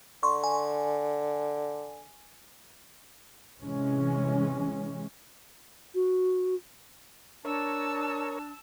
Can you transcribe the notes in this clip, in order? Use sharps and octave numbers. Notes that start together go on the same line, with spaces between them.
D3 C6 C#6
G#5
C3 E3 G#3 C#4
F#4
D4 A#4 C#5 A5 E6